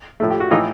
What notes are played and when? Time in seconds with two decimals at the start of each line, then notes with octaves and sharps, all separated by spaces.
0.20 A2 F3 A3
0.30 G4
0.40 F#4
0.51 A2 E3 A3 D#4 F4